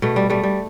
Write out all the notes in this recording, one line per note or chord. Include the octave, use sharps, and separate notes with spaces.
B2 A3
G3
G3 A3
G3